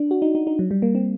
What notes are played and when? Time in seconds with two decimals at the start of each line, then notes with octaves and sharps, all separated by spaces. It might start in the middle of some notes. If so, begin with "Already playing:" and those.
Already playing: D4
0.11 F#4
0.22 D#4
0.35 D#4
0.47 D#4
0.59 F#3
0.71 G3
0.82 A#3
0.95 C4